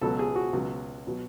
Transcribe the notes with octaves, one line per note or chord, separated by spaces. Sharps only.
C#2 B2 F#3 A4
G#4
F#4
C#2 B2 F#3
B2 F#3